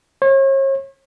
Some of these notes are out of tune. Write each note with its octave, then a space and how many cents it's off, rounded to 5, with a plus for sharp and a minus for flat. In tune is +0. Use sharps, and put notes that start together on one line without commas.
C#5 -40